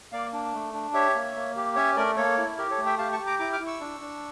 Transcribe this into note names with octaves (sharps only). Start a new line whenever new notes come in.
A#3 D5 F5
D4
A3
D4
G4 C#5 E5
A#3
A#3
G4
C#4 C#5 E5
A3 A#4 D5
A#3 A4 C#5
E4
G4 A#4
A4 C#5
A3
E5 G5
G4 F5 A5
A5 C#6
G4
A#5 D6
E4 A#5 D6
D6 F6
E4
C#6 E6
D4
D4